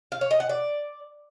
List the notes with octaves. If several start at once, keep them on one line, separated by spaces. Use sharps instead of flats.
F5
C#5
D#5
F#5
D5